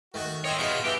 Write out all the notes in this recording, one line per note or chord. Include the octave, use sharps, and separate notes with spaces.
D#3 A3 F#4
C4 C#5 D#5 E5
B2 D#4 F4 G#4 B5
E3 E4 F#4 G4